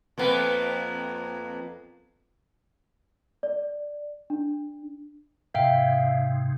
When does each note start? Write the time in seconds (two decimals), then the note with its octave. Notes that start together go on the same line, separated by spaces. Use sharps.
0.18 F2 A#3 B3
3.43 D5
4.30 D4
5.54 G#2 C3 E5 F5 G5